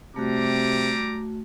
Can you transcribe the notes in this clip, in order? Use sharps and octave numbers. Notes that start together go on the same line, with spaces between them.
C3 G3 A3 F#4 A#5 D6